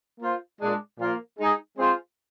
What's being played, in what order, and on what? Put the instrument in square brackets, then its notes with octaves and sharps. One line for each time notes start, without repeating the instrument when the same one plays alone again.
[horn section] A#3 F4 C5
A#2 G#3 D4
A#2 F3 A#3 F4 A#4
G#3 D#4 G#4
G#3 C4 F4 G#4 C5